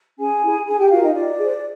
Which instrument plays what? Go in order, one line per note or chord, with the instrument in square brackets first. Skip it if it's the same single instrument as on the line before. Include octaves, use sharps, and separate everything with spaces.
[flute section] C#4 G#4 G#5
E4 G#4
D4 G#4 G#5
G4 G5
F4 F#4 A#4 F5
D#4 D#5
F4 D5
G#4 C5